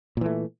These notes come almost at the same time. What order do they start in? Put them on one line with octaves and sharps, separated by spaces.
A#2 E3 A3